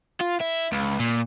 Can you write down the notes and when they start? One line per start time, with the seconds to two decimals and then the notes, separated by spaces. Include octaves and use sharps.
0.21 F4
0.41 E4
0.72 C#2
0.99 A#2